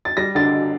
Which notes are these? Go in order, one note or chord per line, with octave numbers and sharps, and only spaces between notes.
A6
G3 A#6
D3 A6